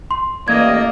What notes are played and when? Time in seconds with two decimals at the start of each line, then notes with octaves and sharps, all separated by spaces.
0.11 C6
0.48 A1 A#3 D5 D#5 G#6